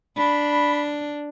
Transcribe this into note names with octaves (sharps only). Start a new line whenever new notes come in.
D4 B5